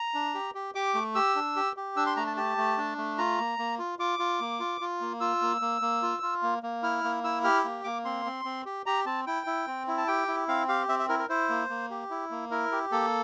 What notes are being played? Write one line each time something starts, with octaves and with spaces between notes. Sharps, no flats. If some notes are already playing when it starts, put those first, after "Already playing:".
Already playing: A#5
D4
G4
G4
G4 D6
A3
G4 E6
D4
G4
G4
D4 E6
C6
A3 A#5
A5
G4 A5
A3
D4
A3
F4 A#5
A#3
A#3
F4
F4 D6
F4
A#3
F4
F4
A#3
F4 E6
A#3
A#3
A#3
F4
F4
A#3
A#3
E4 F6
A#3
E4 E6
G4 F6
A#3
A#3 D6
C4 C6
C4
C4
G4
G4 A#5
C4 A5
E4 G5
E4
C4
E4
A5
G4 G5
E4
C4 F5
G4 F5
C4 E5
E5
E4 A#4
A#4
E4 C5
A#3
A#3
G4
E4
A#3
E4 A#4
G4
A#3 A4